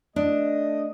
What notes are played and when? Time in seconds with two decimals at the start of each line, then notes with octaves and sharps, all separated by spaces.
0.16 A3 D4 D#5